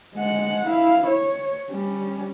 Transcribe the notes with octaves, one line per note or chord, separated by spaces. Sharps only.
G#3 F#5
E4 F5
C#5
G3 C#4